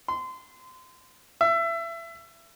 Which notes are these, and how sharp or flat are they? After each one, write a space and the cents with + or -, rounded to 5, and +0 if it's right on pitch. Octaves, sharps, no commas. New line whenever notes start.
C6 -25
E5 +25